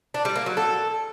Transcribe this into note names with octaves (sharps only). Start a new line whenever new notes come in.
D4
G3
A#3
F#3
A4